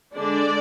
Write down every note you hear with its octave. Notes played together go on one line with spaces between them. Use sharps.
D3 G#3 D4 D5